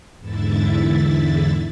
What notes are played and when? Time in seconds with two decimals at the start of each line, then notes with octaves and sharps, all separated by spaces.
0.19 E2 G#2 D3 E4 E5 A6